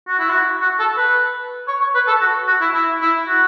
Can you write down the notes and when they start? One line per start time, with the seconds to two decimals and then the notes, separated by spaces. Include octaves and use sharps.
0.08 F#4
0.19 E4
0.30 F#4
0.62 F#4
0.79 A4
0.97 B4
1.68 C#5
1.81 C#5
1.95 B4
2.07 A4
2.21 F#4
2.48 F#4
2.61 E4
2.75 E4
3.01 E4
3.28 F#4